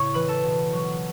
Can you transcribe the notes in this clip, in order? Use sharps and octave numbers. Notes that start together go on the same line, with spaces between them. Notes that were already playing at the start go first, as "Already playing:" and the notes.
Already playing: A2 C#3 C#5 C#6
E3 B4 B5
A4 A5
B2
F#3